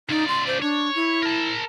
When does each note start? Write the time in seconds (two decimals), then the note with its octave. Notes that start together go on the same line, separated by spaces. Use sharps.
0.09 C#2 D#4 D5
0.28 C6
0.47 C5
0.62 D4 C#5
0.95 E4
1.22 A#4 A5